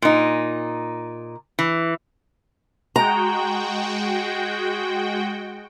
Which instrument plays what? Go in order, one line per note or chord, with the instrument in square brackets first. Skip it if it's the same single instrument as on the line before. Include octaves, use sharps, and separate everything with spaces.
[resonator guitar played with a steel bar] A#2 D#4
E3
[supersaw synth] G#3 F#4 G5 [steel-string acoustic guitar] A#5